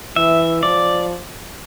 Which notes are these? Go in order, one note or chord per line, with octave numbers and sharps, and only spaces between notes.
E3 E5
F3 D5